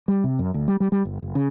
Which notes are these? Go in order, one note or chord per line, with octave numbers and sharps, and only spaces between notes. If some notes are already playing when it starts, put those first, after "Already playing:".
G3
C3
F#2
D2
G3
G3
G3
G1
F#1
C#3